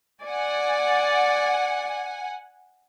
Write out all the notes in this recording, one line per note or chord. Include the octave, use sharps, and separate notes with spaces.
D5 F#5 G#5